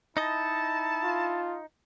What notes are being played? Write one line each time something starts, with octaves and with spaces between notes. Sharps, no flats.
D#4 E4 D#5 A5
F4